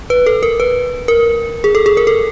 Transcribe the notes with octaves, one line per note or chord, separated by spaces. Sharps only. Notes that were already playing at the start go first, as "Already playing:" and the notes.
B4
A4
A#4
B4
A#4
G#4
A4
G#4
A#4
A4